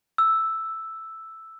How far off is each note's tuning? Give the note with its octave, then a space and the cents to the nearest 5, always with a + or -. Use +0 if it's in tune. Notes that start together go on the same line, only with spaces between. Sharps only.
E6 +0